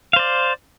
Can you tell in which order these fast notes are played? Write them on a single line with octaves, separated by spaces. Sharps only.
F5 C5 D5